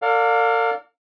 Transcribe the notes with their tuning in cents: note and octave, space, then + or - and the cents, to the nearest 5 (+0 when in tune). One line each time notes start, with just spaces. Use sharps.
A#4 -45 D5 -20 F5 +25